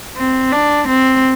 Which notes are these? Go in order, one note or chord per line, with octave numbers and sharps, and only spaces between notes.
C4
D4
C4